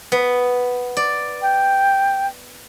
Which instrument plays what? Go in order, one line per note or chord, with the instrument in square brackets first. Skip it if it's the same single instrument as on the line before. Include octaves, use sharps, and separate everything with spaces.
[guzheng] B3
D5
[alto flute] G5